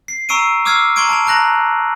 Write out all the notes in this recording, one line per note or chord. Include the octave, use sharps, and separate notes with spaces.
C7
A#5 C#6 E6 C7 D7 D#7
D6 E6 F6 G#6 C7
A#5 C6 C#6 G#6 D7 D#7
A5 G#6 D7 F7
A5 A#5 F#6 A#6 F#7